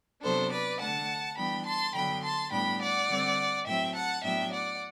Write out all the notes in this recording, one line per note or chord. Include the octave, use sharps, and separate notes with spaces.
C3 F#3 B3 D4 A4 C5
B4 D5
D3 A3 D4 F#5 A5
E3 G3 B3 D4 G5 B5
A5 C6
D3 F#3 B3 D4 G5 B5
A5 C6
A2 G3 B3 D4 G5 B5
D5 F#5
D3 G3 C4
A2 F#3 C4 E5 G5
F#5 A5
A2 F#3 B3 D4 E5 G5
D5 F#5